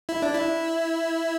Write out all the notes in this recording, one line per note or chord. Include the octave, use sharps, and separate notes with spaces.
E4
D4
E4